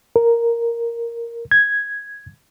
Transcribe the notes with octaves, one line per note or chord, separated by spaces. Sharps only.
A#4
G#6